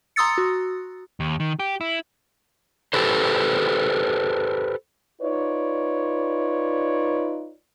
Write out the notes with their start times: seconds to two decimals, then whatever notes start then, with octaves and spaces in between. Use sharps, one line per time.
0.16 A#5 C6 D#6 E6 A6 C#7
0.38 F#4
1.20 D#2
1.40 D#3
1.59 G4
1.81 E4
2.93 G4 A4 B4 C5
5.22 D#4 F4 B4 C#5 D5